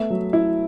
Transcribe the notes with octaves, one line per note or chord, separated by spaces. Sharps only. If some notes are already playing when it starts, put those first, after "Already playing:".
Already playing: A3 B3 E5
F#3
E4